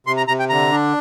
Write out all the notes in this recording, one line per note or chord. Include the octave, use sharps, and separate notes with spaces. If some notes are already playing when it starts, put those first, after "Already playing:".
C3 C6
A#5
C3 A#5
G5
D3 A#5
D4